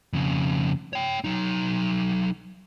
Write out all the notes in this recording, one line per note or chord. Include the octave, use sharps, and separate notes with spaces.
F2 C#3
C#5 G5
F#3 D#4